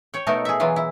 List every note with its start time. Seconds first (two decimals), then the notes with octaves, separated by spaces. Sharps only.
0.14 C#5 G5
0.27 B2 A3 D#4 A4 A#4
0.45 G#4 E5
0.60 E3 F#3 F4
0.76 E4